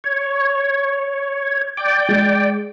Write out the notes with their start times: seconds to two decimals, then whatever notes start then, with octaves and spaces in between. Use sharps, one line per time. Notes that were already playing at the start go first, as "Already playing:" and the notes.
0.04 C#5
1.77 D5 G5
2.09 G#3